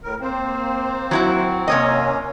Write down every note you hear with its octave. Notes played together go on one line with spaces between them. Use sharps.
A2 A#4
A#3 C4 C5
F#3 E4 F#4
C3 A#3 C#4 C#5 D#5